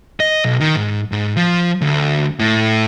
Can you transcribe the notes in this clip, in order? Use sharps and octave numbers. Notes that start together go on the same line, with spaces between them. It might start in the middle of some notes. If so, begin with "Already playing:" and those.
D#5
B1
D#3
G#2
G#2
F3
D2
A2